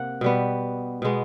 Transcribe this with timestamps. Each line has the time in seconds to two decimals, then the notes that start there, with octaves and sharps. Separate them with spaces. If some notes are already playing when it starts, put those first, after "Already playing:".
Already playing: C3 A#3 F#5
0.21 B2 G3 B3
1.02 B2 G#3 B3